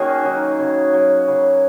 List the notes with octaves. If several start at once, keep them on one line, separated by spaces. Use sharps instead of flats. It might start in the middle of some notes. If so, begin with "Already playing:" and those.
Already playing: D#3 A#3 C#4 F#4 G#4 A#4
F#3 D#4
C#3
F#3
C#3